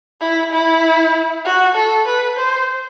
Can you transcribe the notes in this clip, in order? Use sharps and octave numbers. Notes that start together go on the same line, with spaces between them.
E4
E4
F#4
A4
B4
C5